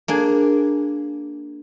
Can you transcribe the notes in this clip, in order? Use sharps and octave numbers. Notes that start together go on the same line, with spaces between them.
A#3 D4 G#4